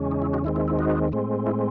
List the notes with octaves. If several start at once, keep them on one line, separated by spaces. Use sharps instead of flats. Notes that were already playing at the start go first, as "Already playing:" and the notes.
Already playing: E2 C#3 G#3 C#4
D#4
E4
D#4 F#4
D#2 D#3 G#3 C4 E4
E4
E4
D#4 F#4
A2 G#3 C4
E4